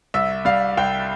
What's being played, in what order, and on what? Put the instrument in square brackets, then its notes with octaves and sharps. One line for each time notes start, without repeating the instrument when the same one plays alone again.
[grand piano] C2 E5
G3 F5
C2 G5